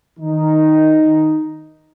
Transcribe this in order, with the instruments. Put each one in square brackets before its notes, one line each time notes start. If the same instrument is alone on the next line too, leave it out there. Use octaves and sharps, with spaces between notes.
[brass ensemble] D#3 D#4